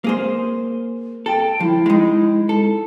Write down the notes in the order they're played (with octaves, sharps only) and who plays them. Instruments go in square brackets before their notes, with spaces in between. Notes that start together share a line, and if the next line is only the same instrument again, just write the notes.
[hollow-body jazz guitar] A#3 G#4 C5
[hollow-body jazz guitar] A4 [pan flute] G5
[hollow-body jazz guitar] F3 [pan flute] E4
[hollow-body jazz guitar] G#3 D#4
A4